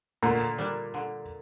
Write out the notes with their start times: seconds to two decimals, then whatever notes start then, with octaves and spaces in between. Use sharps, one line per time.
0.23 A#2 D3
0.58 G3 D4
0.94 D3